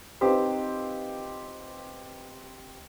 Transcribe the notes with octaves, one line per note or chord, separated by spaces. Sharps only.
C4 D#4 F4 G4 B4 C5